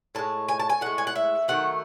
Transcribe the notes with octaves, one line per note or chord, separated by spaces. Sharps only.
A2 G#3 A5
G#5
A5
G#5
A2 G#3 F#5
G#5
F#5
E5
D#3 F#3 A3 F#5